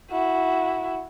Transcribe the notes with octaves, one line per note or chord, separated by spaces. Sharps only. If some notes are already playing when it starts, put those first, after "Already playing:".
E4 F#4